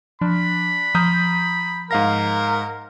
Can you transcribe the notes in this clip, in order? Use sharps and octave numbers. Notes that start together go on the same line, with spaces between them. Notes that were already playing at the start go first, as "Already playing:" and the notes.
F3 D4 B5
F3 A#5 D#6 G6
G#2 A#4 F5 A#6